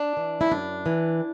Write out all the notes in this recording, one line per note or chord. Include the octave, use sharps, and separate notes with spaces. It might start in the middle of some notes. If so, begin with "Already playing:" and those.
Already playing: D4
E3
E4
F#2 D4
E3